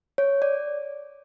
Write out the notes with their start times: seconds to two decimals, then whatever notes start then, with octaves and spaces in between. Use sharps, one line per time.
0.18 C#5
0.42 D5